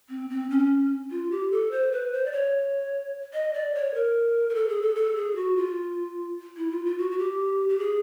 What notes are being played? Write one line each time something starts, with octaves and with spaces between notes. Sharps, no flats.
C4
C4
C#4
F4
G4
A4
C5
B4
C5
D5
C#5
D#5
D5
C#5
A#4
A#4
A4
G#4
A4
A4
G#4
F#4
F4
E4
F4
F4
F#4
F#4
G4
G4
G#4